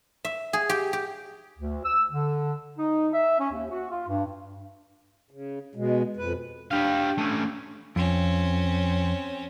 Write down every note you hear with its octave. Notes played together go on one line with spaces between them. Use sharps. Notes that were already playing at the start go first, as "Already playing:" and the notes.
E5
G#4
G4
G4
D2
E6
D3
D#4
E5
C#4
D#2
F#4
F4
G2
C#3
B2 G#3
F2 B4
D4 G4 F5
A3 C#4
F2 C4 C#4